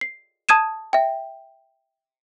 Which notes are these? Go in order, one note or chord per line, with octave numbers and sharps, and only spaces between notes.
C7
A5 D#6 G#6 D#7 E7
E5 G5